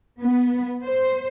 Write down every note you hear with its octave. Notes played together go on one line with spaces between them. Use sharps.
B3
C5